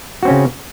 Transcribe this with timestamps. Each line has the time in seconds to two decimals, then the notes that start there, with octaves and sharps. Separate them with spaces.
0.23 F#4
0.25 C4
0.28 C#4
0.30 C#3